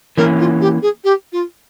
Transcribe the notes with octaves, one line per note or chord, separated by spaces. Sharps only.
E3 A#3 C#4 A#4
F4
G4
G#4
G4
F4